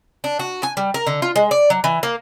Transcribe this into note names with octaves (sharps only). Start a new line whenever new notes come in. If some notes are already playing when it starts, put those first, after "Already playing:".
D4
F#4
G#5
G3
A#4
D3
F4
G#3
D5
F#3
E3
A#3